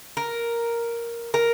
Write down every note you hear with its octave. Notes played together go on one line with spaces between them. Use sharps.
A#4
A#4